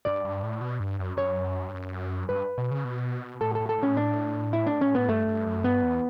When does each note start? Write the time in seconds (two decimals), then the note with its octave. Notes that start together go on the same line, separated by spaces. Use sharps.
0.05 G2 D5
0.25 G2
0.43 A2
0.61 B2
0.80 G2
0.99 F#2
1.17 F#2 C#5
1.69 G2
1.74 F#2
2.29 G2 B4
2.58 B2
2.71 C#3
2.84 B2
3.41 A2 A4
3.55 A4
3.60 A2
3.69 A4
3.79 A2 C#4
3.97 D4
4.53 E4
4.67 D4
4.81 C#4
4.95 A2 B3
5.08 G2 A3
5.27 G2
5.47 F#2
5.64 G2 B3
5.83 E2